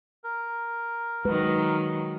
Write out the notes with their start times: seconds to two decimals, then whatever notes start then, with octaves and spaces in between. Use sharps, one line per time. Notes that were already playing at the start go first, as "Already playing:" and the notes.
0.24 A#4
1.25 D#3 F#3 G#3 B4